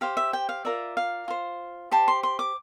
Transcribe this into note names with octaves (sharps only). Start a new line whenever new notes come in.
G4 C5 F5
E5
G5
F5
F4 A#4 D5 E5
F5
F4 C5
G4 C5 A5
C6
C6
D6